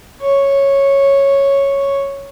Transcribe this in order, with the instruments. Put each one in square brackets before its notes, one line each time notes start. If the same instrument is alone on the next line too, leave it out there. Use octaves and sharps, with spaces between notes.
[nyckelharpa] C#5